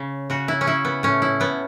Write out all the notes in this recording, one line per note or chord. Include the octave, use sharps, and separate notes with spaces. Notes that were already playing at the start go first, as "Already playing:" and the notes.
Already playing: C#3
C#3 F#4
E4
C#4
C#3 E4
B3
A2 C#4
E4
A2 B3